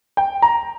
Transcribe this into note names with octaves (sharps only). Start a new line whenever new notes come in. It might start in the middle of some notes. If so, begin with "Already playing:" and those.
G5
A#5